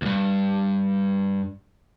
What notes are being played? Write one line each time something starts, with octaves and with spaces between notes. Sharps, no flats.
D2 G2